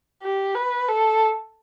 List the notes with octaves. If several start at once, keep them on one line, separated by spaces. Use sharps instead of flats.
G4
B4
A4